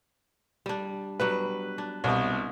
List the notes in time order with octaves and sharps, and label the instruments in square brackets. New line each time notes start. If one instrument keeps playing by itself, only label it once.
[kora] G3 D4
[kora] F#3 G3 B3 [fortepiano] B4
[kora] D4
[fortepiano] C2 B2